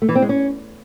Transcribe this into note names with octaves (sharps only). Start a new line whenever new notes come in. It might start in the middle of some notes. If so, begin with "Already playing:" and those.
A3
E3
C4
G#3
C#4